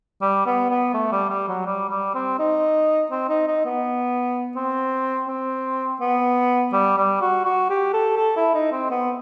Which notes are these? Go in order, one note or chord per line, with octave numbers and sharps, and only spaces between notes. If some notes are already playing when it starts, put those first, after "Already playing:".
G3
B3
B3
A3
G3
G3
F#3
G3
G3
C4
D#4
C4
D#4
D#4
B3
C4
C4
B3
G3
G3
F#4
F#4
G4
A4
A4
E4
D#4
C4
B3